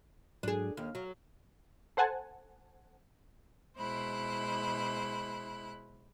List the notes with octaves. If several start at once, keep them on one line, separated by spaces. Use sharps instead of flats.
G#2 F#3 D4 G#4
D#2 F5
F#3
A4 C5 F#5 G#5 A5
B2 G#3 E4 C5 B5 F#6